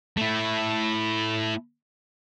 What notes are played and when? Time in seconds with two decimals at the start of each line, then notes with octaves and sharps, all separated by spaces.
0.17 A3 E4